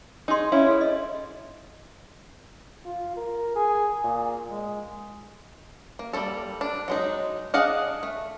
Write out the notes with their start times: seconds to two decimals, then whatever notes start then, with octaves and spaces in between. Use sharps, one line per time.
0.28 D#4 G#4 G#5 C6
0.52 C#4 E4 F5
0.66 G#4 A4
0.81 D#5
2.85 F4
3.16 A#4
3.55 G#4
4.04 A#2
4.49 G#3
5.99 A#3
6.13 G3 A#3 C#4 A4
6.61 D4
6.88 F#3 G#3 D#4
7.54 D4 G#4 D#5 F5 F#5
8.03 A3